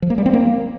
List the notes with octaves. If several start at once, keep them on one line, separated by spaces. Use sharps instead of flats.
F3
A#3
G3
C4
A#3